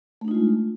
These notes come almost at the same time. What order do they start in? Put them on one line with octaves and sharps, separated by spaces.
A3 D4 D#4 F4 G#3